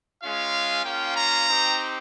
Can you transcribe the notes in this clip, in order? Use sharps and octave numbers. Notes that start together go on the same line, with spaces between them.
G#3 C#4 F4 F5
A#3 C#4 F4 G5
A#5
C4 D#4 G4